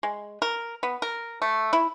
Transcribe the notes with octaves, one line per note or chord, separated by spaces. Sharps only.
G#3
A#4
B3
A#4
A3
E4